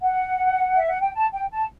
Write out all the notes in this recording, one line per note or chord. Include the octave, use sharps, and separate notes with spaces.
F#5
E5
F#5
G5
A5
G5
A5